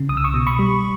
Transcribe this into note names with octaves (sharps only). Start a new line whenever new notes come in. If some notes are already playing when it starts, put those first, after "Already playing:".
Already playing: C#3
C2 D#6
E6
C#6 D#6
B2
B5 C#6
G3